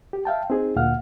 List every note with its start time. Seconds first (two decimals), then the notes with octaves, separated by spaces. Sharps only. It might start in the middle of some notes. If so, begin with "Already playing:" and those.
0.13 G4
0.25 E5 F5 G5 A5
0.50 C4 D#4 G#4
0.76 D2 A#2 F5 F#5 F6